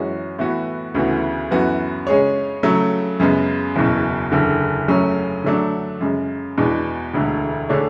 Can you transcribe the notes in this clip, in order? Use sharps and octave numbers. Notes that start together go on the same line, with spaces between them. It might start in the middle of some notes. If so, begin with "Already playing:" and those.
Already playing: F#2 E3 G#3 C#4 F#4
A2 E3 B3 F#4
D2 C#3 E3 B3 F#4
F#2 E3 B3 F#4 B4
C#3 G#3 C#4 G#4 C#5
C#3 F#3 A3
F#2 C#3 G#3 B3
F#1 E2 B2
F#1 E2 D3
F#2 C#3 F#3 A3 C#4
D3 F#3 A3 D4
F#2 C#3 G#3
E2 B2 G#3 B3 D4
E1 D2 D3
D3 A3 D4 G#4 C#5